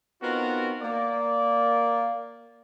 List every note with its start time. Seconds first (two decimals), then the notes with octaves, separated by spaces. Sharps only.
0.21 B3 C4 D#4 F4 F#4 A#4
0.81 A#3 D5